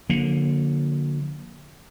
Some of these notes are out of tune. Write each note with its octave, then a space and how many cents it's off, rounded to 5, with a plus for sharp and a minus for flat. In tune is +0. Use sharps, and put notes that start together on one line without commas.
D3 +0 F3 +45 A#3 +15